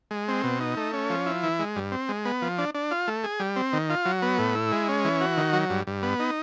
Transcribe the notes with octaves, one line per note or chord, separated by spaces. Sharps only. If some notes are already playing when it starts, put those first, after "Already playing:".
G#3
C4
B2
D#4
A3
C#4
F3
E4
E3
G#3
G2
C4
G#3
B3
F3
D4
D4
F4
A3
G#4
G3
C4
D#3
F4
F#3
B3
A2
E4
G#3
C#4
E3
F#4
D#3
F#3
G2
G2
B3
D#4